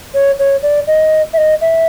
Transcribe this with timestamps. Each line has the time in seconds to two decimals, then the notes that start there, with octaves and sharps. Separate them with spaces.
0.14 C#5
0.39 C#5
0.63 D5
0.87 D#5
1.33 E5
1.37 D#5
1.61 E5